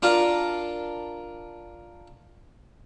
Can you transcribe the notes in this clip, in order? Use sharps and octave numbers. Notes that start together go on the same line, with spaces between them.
D4 F4 A#4